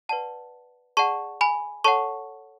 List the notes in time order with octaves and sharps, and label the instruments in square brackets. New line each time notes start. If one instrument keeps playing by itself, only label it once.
[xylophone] B4 D5 F#5 A5
G#4 D5 F#5 A5 C#6
G#5 B5
A4 C#5 F#5 A5 C#6